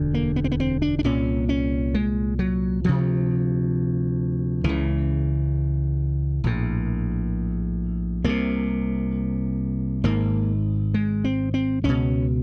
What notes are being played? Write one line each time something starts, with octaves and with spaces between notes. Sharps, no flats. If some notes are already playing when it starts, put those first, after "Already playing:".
Already playing: E1 D2 D3
A#3
B3
C4
B3
C4
D4
D4
C2 A#2 C#4
C#4
G#3
F#3
D2 C3 F3
C#2 C#3 E3
A#1 A2
C2 C3 A#3
G#1 G#2 A#3
G#3
C4
C4
C#2 B2 C#4